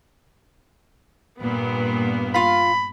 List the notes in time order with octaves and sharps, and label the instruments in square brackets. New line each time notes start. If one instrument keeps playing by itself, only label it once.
[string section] G2 A#2 B3
[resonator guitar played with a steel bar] F4 F5 [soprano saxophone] B5